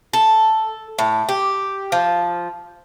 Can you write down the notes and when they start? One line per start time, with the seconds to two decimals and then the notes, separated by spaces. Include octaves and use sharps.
0.13 A4
0.99 A2
1.29 G4
1.92 F3